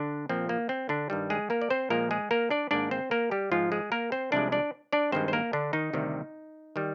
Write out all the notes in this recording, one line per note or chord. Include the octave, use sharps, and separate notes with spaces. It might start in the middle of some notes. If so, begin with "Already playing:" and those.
Already playing: D3 D4
A#2 F3 A#3 C4
A#3
C4
D3 D4
G2 D#3 G3
G#3 G#4
A#3 A#4
D5
C4 C5
A#2 F3 G#3 A#3 A#4
G#3 G#4
A#3 A#4
D4 D5
G#2 D#3 A#3 D4 D5
C4 C5
A#3 A#4
G3 G4
G#2 F3 G#3 F4
G#3 G#4
A#3 A#4
C4 C5
C2 C3 F3 G#3 D4 D5
D4 D5
D4 D5
G2 D#3 G#3 C4 C5
C5
A#3 A#4
D3 D4
D#3 D#4
D2 C3 D#3 G3
D#3 G3